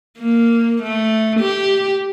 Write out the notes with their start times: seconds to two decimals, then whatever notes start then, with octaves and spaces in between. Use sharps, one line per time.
0.19 A#3
0.83 A3
1.40 G4